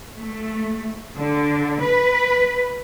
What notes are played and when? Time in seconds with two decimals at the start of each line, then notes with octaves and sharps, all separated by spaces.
0.17 A3
1.17 D3
1.82 B4